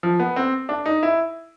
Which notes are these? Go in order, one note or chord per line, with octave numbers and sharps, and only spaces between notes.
F3
B3
C4
D4
D#4
E4